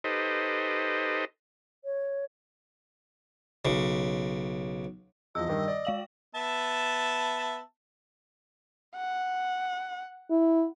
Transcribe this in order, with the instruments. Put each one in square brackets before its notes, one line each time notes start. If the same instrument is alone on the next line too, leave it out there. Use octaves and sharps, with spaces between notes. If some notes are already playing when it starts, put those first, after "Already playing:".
[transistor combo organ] D#4 G4 A4 B4 C5 D#5
[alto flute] C#5
[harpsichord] B1 C#3
[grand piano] E2 F3 [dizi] D#5 [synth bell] E6
[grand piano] G2 D#3
D5
[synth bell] G#3 F5 F#7
[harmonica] B3 E5 A5
[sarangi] F#5
[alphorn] E4